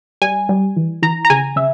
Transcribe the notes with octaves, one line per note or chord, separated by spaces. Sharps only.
G3 G#5
G3
E3
E3 A#5
A#5
C#3 G#5
C#3 E5